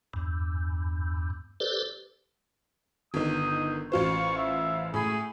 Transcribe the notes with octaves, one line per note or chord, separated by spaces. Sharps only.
E2 G2
G4 A4 B4 C5 D5
G1 D#3 D#6
A1 F4 C5 C#6
E5
A2 G#4 B5